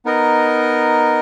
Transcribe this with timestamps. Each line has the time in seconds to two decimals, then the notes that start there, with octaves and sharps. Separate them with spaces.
0.05 B3 D#4 A#4 D#5